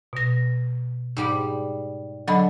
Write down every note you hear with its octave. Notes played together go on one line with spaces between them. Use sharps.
B2 A#6
G#2 G3 B5
D3 F#3 D#5 B5